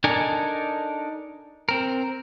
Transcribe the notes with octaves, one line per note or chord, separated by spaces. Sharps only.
D4 D#4 A4 A#4 G#5
C4 A#4